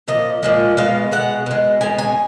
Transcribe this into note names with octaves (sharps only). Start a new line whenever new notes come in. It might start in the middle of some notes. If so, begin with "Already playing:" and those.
A#2 F3 D#5
A#2 F3 G#3
B2 G#3 F5
B2 G#3 F#5
B2 G#3
B2 G#3 G#5
G#5